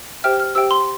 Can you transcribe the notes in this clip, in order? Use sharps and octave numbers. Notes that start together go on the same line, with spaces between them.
G4 C5 E5 G5 F6
F6
G4 C5 E5 G5 E6
C6